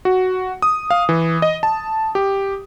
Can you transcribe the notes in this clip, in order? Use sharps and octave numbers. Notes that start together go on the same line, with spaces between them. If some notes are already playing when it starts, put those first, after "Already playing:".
F#4
D#6
F5
E3
D#5
A5
G4